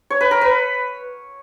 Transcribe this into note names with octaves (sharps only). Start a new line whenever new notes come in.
C#5
B4
A#4
B4